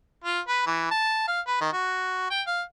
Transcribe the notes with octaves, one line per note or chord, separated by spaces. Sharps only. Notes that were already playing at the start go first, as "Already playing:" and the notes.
F4
B4
E3
A5
F5
B4
D#3
F#4
G5
F5